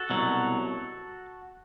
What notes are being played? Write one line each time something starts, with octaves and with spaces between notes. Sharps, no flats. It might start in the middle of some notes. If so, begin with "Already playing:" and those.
Already playing: F#4 A4
C2 B2 F#3